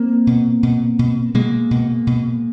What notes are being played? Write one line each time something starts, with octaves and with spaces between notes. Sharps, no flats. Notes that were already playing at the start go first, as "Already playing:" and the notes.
Already playing: A#3 C4
B2
B2
B2
B2 G#3 A#3
B2
B2